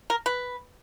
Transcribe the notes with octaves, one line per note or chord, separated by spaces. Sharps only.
A#4
B4